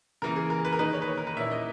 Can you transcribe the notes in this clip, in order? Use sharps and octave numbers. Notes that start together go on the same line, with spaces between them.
C#3 E3 A#3 A#4
G#4
A#4
B4
A#4
D#3 A#3 D#4 B4
C#5
B4
C#5
A#4
B4
A#2 A#3 C#4 E4 E5
D#5